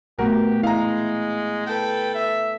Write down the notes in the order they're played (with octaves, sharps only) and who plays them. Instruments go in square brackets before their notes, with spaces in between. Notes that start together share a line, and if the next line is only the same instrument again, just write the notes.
[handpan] A#2 A3 B3 [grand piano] F#4 A#4 [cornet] G4
[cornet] G#3 [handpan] E4 [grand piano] F5 A#5
[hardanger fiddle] A4 B4 [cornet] G5
[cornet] E5